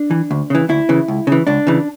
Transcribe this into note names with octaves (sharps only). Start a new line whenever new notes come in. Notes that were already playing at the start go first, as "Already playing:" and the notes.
Already playing: D4
E3
D2
C#3 E3
D2 E4
C#3 E3
C#2
C#3 E3
C#2 D4
C#3 E3